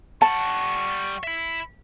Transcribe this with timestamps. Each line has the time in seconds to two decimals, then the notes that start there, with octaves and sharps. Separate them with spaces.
0.22 G3 F#5 A5 C#6
1.23 E4 E5